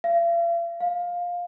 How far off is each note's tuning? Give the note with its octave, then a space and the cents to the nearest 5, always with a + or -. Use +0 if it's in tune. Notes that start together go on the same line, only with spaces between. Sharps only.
F5 -45
F5 +15